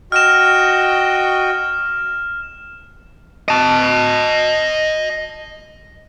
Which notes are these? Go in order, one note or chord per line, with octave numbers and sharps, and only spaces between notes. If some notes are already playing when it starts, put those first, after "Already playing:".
F#4 D#5 G5 F6 E7
D#5 A5